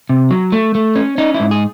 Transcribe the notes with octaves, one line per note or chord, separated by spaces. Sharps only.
C3
F#3
A3
A3
C#4
C#4 D#4
E4
G#2
G#4